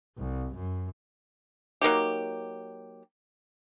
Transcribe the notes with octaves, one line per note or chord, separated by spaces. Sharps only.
C2
F#2
F#3 A#3 D#4 G4